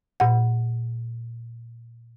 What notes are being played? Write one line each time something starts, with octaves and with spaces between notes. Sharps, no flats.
A#2 F#5